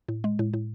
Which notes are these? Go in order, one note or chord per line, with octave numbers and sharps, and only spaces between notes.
A2
G#3
A2
A2